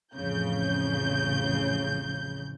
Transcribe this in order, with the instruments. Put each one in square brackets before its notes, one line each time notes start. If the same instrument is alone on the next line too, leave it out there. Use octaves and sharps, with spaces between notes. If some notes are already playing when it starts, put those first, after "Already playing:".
[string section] A1 F2 C#3 G6